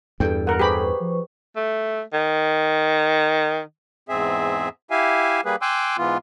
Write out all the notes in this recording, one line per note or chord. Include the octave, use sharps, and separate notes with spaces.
E2 G2 A4 G5
A#4 F#5
G4 G#4 B4 C5 B5 C#6
F3
A3
D#3
E2 G#2 C4 G#4 E5
E4 G4 E5 F5 G#5
G3 A#3 G#4 B4
G5 G#5 C6 D6 E6 F#6
G#2 E3 B3 F4